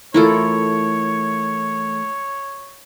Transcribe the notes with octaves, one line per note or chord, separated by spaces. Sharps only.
E3 A3 E4 F4 A4 A#4 C#5